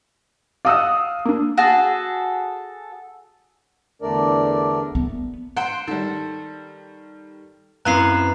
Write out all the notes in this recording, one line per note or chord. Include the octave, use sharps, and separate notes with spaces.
D5 D#5 F5 F#5 D#6 E6
A#3 D4
F#4 G#4 A4
E2 D3 A3 D4 A#4 D5
B3
C5 F#5 G5 C6
D#3 G3 A4
F#2 B3 C4 E4 F5 A#5 F#6 C7